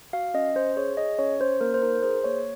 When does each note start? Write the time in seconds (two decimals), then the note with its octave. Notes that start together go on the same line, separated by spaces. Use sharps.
0.13 F#4 F5
0.34 C#4 D#5
0.55 C#4 C5
0.77 G#4 C#5
0.97 G#4 D#5
1.19 C#4 C#5
1.39 C#4 C5
1.61 A#3 A#4
1.74 C5
1.82 D#4 A#4
2.03 G#4 C5
2.24 A#3 C#5